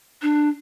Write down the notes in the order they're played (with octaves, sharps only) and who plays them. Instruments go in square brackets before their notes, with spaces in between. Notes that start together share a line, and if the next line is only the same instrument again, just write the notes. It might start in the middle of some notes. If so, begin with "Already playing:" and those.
[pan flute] D4